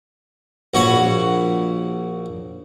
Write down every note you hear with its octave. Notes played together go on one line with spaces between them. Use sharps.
A#1 F#4 C#5 B5